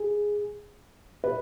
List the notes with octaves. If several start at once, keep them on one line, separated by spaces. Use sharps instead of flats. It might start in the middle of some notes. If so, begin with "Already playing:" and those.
Already playing: G#4
B4